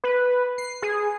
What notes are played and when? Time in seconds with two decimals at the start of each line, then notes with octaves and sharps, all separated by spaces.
0.04 B4
0.58 C7
0.82 G#4